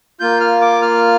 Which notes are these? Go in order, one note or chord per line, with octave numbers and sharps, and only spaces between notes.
A#3 F4 G6
F6
D6
F6